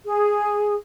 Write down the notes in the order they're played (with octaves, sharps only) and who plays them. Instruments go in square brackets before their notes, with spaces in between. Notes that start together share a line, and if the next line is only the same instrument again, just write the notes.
[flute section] G#4